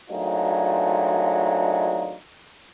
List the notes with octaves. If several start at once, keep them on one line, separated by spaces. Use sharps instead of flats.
G#1 F#3 A3 D4 D#4 F4